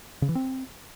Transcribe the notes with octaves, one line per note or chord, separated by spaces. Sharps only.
C#3
E3
C4